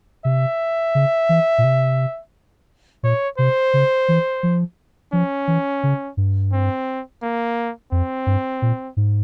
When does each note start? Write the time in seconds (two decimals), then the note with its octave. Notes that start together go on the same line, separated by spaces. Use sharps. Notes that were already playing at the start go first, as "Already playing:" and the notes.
0.25 C3 E5
0.95 C#3
1.29 E3
1.58 A#2
1.64 C3
3.03 A#2 C#5
3.38 C3 C5
3.74 C#3
4.08 E3
4.43 F3
5.13 F3 C#4
5.48 E3
5.83 C#3
6.17 G2
6.53 C4
7.22 A#3
7.92 F2 C4
8.27 G2
8.62 A#2
8.97 G#2